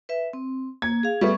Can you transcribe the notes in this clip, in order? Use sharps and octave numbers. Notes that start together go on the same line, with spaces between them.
B4 E5
C4
A#3 G#6
G#4 F5
G3 A3 B3 C#6